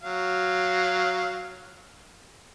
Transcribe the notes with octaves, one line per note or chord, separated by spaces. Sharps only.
F#3 F5